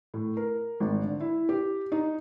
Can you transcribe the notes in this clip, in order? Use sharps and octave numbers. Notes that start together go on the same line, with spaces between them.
A2
A#4
G#1
D3
E4
G4
D#4